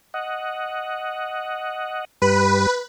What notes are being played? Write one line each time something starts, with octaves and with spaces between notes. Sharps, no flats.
D#5 F#5
G2 G3 B4